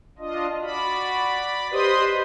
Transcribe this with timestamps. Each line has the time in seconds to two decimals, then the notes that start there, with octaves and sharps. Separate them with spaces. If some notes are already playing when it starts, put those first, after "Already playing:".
0.18 D4 F4 D#5
0.63 F#4 D5 B5
1.72 G4 B4 C5 D#5 C6 D#6